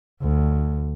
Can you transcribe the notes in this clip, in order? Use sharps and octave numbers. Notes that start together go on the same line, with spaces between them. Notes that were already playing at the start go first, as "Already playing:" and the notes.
D2